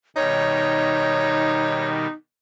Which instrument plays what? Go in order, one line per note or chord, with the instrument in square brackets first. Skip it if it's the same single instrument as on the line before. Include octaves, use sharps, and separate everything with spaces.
[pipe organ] B2 D#3 G3 [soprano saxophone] D#4 [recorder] C#5